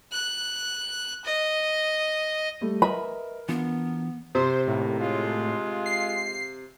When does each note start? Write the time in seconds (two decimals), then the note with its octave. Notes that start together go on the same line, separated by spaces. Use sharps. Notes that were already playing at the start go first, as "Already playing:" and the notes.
0.12 F#6
1.25 D#5
2.61 G3 A3
2.82 A#4 B4 D#5 E5 B5
3.49 E3 B3 D4 F4
4.35 C3 C5
4.67 A1 D#2 A2 A#4
4.99 G#3 F4
5.86 C7